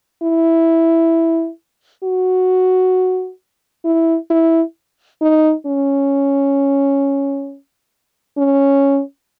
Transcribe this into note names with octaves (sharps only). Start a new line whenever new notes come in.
E4
F#4
E4
E4
D#4
C#4
C#4